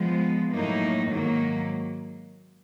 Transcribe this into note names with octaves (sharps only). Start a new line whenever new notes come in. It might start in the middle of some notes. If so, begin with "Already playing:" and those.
Already playing: F3 G#3 B3
A2 F#3 A#3 D#4
G#2 D#3 F#3 A#3